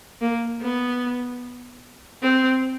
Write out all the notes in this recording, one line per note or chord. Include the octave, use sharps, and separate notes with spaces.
A#3
B3
C4